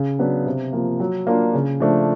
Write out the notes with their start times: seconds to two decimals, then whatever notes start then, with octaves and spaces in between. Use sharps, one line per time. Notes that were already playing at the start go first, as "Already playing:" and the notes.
Already playing: C#3
0.19 F#3 B3 D4
0.46 C3
0.73 F3 A#3
1.00 F#3
1.27 A#3 D4 F4
1.54 C#3
1.80 F3 A3 D4